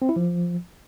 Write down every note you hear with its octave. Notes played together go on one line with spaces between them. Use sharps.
C4
E4
F3